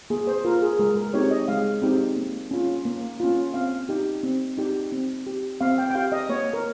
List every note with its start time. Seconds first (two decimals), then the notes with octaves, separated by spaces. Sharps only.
0.10 A#3 G#4
0.27 C5
0.45 F4 A#4
0.62 G#4
0.79 G#3 A#4
0.97 A#4
1.14 C4 D#4 G4 C#5
1.31 D#5
1.48 G#3 F5
1.82 C4 D#4 G4
2.16 A#3
2.51 C#4 F4
2.85 A#3
3.20 C#4 F4
3.54 C4 F5
3.89 D#4 G4
4.23 C4
4.58 D#4 G4
4.92 C4
5.26 G4
5.61 C4 F5
5.78 G5
5.90 G5
5.95 G4 F5
6.12 D#5
6.29 A#3 C#5
6.53 A#4